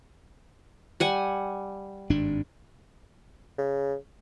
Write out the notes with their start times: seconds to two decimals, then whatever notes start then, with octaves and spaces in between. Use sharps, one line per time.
1.00 G3 F#5 G#5
2.10 G#1 G2 D4
3.58 C#3